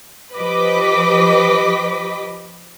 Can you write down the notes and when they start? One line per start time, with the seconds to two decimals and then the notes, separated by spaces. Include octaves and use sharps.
0.37 F3 G4 B4 D#5 D6 B6